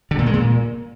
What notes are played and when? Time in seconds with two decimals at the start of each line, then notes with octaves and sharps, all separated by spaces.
0.11 D3
0.18 A#2
0.26 G#3
0.34 A#2